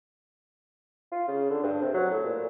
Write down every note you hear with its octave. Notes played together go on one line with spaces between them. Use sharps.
F4
C#3
D3
G2
C3
F#3
A2
A#2